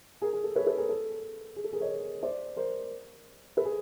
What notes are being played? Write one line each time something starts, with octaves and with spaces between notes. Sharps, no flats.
G#4 A#4
G#4
A4
B4 C#5
A4 B4
G#4 A#4
A4
G#4
A4
G#4 A#4
C#5 D#5
C5 D5
A#4 C5
A4 B4
G#4